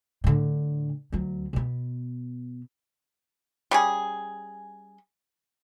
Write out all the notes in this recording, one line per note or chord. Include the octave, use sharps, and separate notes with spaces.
A2 D3
D2 F#3
B2 B3
G3 C#4 G#4